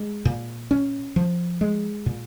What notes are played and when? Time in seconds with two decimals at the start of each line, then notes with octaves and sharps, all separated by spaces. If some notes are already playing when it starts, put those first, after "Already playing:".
Already playing: G#3
0.25 A#2
0.71 C#4
1.16 F3
1.61 G#3
2.06 A#2